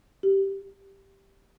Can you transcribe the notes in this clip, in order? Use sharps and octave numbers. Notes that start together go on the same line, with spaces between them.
G4